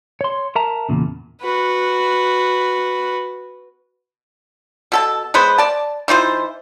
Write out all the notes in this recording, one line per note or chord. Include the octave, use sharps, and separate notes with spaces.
C#5 C6
A#4 E5 A5 A#5
E2 A#2 C#3
F#4 B4
B2 A4 A5
G#3 B3 B4 C5
D5 A5
E3 D#4 F4 C5